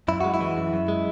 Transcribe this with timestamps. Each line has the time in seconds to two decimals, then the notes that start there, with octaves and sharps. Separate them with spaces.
0.08 F#2 E4
0.21 G#3 F#4
0.34 E4
0.41 E3
0.57 F#2
0.73 F#2
0.88 G#3